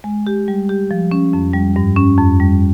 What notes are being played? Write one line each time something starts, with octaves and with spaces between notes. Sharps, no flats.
G#3
G4
G3
G4
F3
C#4
F2
G3
G2
C#4
F2
G3